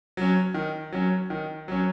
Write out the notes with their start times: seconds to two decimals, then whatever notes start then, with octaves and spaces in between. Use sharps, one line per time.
0.17 F#3 C#4
0.54 D#3
0.92 F#3 C#4
1.30 D#3
1.68 F#3 C#4